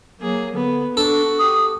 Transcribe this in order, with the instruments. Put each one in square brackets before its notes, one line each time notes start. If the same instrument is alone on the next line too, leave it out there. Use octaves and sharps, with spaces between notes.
[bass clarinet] F#3 [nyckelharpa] A#3 G#4
[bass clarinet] D3 [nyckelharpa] B3 B4
[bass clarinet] D4 [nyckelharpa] F#4 [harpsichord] A4
[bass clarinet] G4 [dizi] D#6